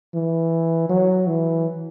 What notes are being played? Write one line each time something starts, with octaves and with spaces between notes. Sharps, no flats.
E3
F#3
E3